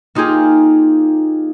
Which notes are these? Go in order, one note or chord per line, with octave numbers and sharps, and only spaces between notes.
A#3 D#4 F4 G4 G#4